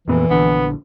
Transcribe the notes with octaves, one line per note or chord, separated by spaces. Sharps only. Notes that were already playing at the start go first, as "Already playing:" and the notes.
F2 A#2 E3 B3
A#1 D3 B3